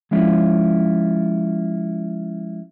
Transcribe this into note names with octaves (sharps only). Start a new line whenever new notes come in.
F3 G#3 C#4 E4 F4